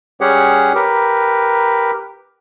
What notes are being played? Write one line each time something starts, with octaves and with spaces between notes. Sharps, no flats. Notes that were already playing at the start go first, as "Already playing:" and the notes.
G3 C#4 G4 G#4 C#5 F#5
G4 A#4 B4